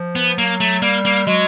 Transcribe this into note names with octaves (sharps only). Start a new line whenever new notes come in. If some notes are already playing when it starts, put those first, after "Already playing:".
Already playing: F3
B3
F#3 A#3
A3
G3 A#3
A#3
F#3 G#3